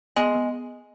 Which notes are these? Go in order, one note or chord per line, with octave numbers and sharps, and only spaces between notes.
G#3 B3
B3